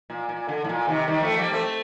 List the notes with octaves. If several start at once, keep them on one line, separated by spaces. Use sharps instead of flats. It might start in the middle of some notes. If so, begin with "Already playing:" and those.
A#2
A#2
D3
A2
A#2
C3 D#3
D#3 G3
F3 A3
G3 A#3
A3 C4